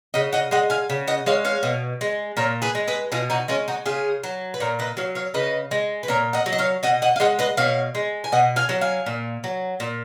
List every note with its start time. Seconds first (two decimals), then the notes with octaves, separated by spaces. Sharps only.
0.14 C#3 D#5 F#5
0.33 D#5 F#5
0.51 G#3 D#5 F#5
0.70 F5 G#5
0.90 C#3
1.08 D#5 F#5
1.26 G#3 C#5 F5
1.45 C#5 F5
1.63 B2
2.01 G#3
2.37 A#2 A#4 C#5
2.62 G#4 B4
2.75 G#3
2.88 G#4 B4
3.12 B2 F4 G#4
3.30 D#4 F#4
3.48 G#3 C#4 F4
3.68 D#4 F#4
3.86 C#3 F4 G#4
4.23 F#3
4.54 B4
4.60 A#2 A#4 C#5
4.79 B4 D#5
4.97 F#3 C#5 F5
5.15 C#5 F5
5.34 C#3 B4 D#5
5.71 G#3
6.03 B4
6.08 A#2 A#4 C#5
6.33 D#5 F#5
6.46 F#3
6.53 D#5
6.58 C#5 F5
6.83 B2 D#5 F#5
7.02 D#5 F#5
7.16 F5
7.20 G#3 D#5 F#5
7.39 B4 D#5
7.57 B2 C#5 F5
7.95 G#3
8.24 G#5
8.32 B2 D#5 F#5
8.56 F5 G#5
8.69 F#3
8.81 F5 G#5
9.06 A#2
9.44 F#3
9.80 A#2